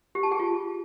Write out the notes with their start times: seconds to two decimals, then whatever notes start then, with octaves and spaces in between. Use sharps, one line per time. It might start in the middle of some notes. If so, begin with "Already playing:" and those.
0.15 G4
0.23 A5
0.31 G#4
0.40 F4